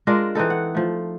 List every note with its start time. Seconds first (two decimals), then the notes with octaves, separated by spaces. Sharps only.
0.07 G#3 D4 F4 A#4
0.35 E3 C4 D#4 A4
0.50 F#5
0.75 F3 A3